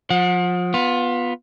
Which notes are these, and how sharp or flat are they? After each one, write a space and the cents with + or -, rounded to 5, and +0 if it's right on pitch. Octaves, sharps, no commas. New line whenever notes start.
F3 +30 F#5 -30
B3 +0 F4 +20